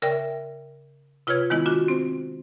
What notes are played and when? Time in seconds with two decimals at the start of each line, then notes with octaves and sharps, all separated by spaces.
0.02 C#3 A#4 D5 E5 G5
1.27 C3 F4 B4 C#5 F6 G#6
1.50 D#3 G#3 B3 E4 F4
1.66 D4 F4 F#4
1.88 C4 C5